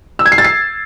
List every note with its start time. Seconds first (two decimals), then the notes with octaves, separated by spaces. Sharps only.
0.19 E6
0.26 G#6
0.32 C7
0.38 A6
0.44 C7